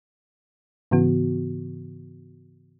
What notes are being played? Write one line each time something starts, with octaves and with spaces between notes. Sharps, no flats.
G#2 C#3 E3 B3 F#4